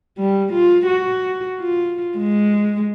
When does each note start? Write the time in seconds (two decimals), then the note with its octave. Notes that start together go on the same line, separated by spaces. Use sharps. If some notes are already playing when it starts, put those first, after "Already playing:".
0.19 G3
0.54 F4
0.87 F#4
1.60 F4
2.18 G#3